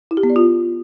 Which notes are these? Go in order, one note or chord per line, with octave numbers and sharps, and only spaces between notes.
E4
G4
B3
D5
F4